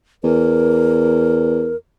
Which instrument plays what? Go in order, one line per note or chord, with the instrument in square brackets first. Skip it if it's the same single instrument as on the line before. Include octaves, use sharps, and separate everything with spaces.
[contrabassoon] E2 [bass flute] A#4